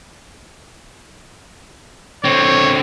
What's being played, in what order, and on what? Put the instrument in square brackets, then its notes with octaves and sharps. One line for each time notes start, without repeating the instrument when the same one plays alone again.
[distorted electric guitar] D3 C4 [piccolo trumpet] C#5